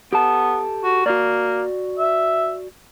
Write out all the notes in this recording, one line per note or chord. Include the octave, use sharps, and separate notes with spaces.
B3 G4 A4 A5
F#4
A#3 F#4 D5
E5